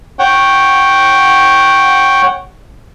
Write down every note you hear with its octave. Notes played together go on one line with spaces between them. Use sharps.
C#5 F#5 G5